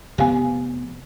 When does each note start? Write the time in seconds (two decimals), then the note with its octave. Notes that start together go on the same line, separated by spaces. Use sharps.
0.18 F1 C3 B3 G4 F5 G#5